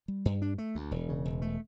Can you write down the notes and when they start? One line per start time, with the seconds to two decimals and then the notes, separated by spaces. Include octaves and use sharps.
0.08 G3
0.25 G2
0.42 D4
0.58 A3
0.75 D2
0.91 E1
1.09 C#3
1.25 E1
1.42 A3